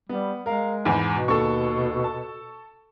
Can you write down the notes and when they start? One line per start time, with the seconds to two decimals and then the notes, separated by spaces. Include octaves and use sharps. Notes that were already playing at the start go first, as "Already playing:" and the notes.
0.09 G3 B3
0.46 G#3 A#4 F5
0.85 E2 G#2 B5
1.09 B2
1.28 D#2 A4 C#6
2.04 A5